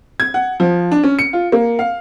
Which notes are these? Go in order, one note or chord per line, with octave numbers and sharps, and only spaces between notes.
G#6
F#5
F3
D4
C#4
C#7
F4
A#3
F5